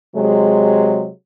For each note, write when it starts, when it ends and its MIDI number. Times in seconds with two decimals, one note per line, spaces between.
0.15 1.08 48
0.15 1.08 54
0.15 1.08 56